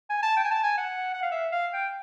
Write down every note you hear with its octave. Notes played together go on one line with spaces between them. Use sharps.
G#5
A5
G5
G#5
A5
G#5
F#5
F#5
F5
E5
F5
G5